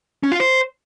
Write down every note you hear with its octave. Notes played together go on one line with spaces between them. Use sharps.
C#4
F4
C5